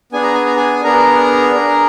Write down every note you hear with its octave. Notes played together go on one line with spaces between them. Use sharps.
B3 D4 G#4 G#5
A#5
G#5
A#5
G#4 G#5
B3 D4 G#4 A#4 A#5
D4 G#4